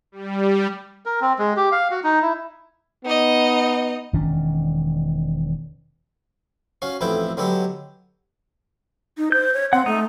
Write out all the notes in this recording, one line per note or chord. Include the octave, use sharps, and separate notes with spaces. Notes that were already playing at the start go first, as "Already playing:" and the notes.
G3
A#4
C4
G#3
G4
F5
F#4
D#4
E4
B3 D#4 D#5
E1 D#3 C#4 D4
C#4 F#4 F5
A1 F2 B2 E4 A4 G5
D3 F#3 G#3 B3 G4 A4
D#4
C5 G6
C#5
C4 F#5
A3 D#4